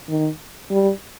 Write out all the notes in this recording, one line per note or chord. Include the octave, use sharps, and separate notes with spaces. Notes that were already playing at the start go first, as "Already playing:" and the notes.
D#3
G3